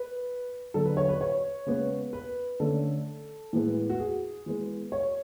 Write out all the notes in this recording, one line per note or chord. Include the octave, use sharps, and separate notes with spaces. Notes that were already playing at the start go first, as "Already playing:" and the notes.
Already playing: B4
D3 F#3 B3 A4
B4
C#5
B4
C#5
C#3 G#3 B3
B4
D3 A3 C#4 A4
A2 E3 G#3 B3
F#4
G#4
E3 G#3 B3
C#5